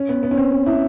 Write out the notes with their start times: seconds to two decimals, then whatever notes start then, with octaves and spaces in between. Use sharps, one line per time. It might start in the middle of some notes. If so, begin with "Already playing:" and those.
Already playing: C#4
0.09 B3
0.23 B3
0.31 C#4
0.37 C4
0.52 C4
0.66 E4